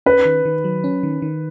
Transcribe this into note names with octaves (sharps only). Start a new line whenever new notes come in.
C#4 B4
D#3
D#3
F#3
C#4
D#3
D#3